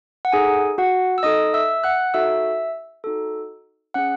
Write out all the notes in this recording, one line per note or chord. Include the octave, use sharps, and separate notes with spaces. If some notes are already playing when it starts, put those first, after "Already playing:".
F#5
D#4 G#4 A4 G#5
F#4 F#5
E6
D#4 A4 D#5 D#6
E5 E6
F#5 F#6
D#4 F#4 A4 E5 E6
D#4 F#4 A4
C#4 G#4 F#5 F#6